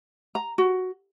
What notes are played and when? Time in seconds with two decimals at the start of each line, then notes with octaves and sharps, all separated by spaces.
0.35 A#5
0.58 F#4